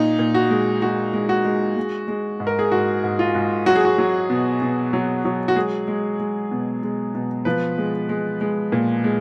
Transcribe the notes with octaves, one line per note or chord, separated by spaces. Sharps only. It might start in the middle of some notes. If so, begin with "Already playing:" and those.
Already playing: A#2 D#4
A#2
F#4
G#3
G#3 F#4
G#3
F#4
G#3
G#3
G#3
G#2
A#4
G#4
G#2 F#4
G#2
F4
G#2
F#3 F#4
G#4
F#4
F#3
B2
B2
F#3
F#3
F#4
G#3 G#4
G#3
G#3
B2
G#3
B2
F3 B4
G#3
G#3
G#3
A#2
G#3